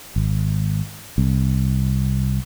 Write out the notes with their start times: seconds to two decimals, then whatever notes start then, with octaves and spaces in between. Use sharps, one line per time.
0.16 G#1
1.18 C2